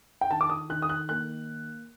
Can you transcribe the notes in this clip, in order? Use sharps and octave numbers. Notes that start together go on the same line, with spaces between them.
G5
D#3 A5
D6
D#6
D#3 F#6
D#6
F#6
A#3 F#6